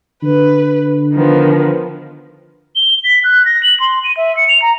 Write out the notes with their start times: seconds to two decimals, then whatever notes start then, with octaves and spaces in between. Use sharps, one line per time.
0.23 D3 B4
1.13 D#3 F3 B3
2.76 G7
3.05 B6
3.24 F#6
3.46 A#6
3.63 F#7
3.80 C6
4.04 D#7
4.17 E5
4.37 C#7
4.49 F7
4.62 A#5